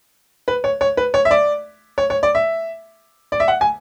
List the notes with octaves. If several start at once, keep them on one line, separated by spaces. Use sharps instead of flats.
B4
C#5
C#5
B4
C#5
E5
D5
C#5
C#5
D5
E5
D5
E5
F#5
G#5